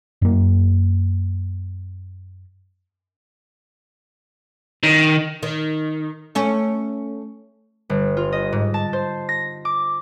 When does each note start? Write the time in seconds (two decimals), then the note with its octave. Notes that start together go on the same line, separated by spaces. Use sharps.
0.22 F#2 A#3
4.83 D#3
5.43 D#3
6.35 A3 C#4
7.90 G1
8.17 F4
8.32 D#5
8.53 G#2
8.74 A5
8.93 C5
9.29 A#6
9.65 D6